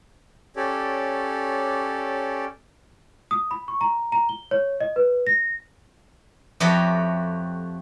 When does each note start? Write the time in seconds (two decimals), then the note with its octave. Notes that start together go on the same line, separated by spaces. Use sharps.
0.56 C#4 G4 A4 C#5 D5
3.31 D#6
3.51 B5
3.68 C#6
3.81 A#5
4.12 A#5
4.29 G7
4.51 C#5
4.80 D#5
4.96 B4
5.27 A#6
6.60 F2 A3 F#4 G4 C#5 D#5